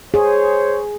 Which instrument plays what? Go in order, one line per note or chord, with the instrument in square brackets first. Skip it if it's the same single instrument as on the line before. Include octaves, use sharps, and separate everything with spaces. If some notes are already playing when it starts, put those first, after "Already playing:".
[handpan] G#4 [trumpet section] C5 C#5